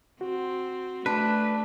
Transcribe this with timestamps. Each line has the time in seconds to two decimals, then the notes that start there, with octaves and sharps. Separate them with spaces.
0.21 C4 F#4
1.06 A3 D4 B4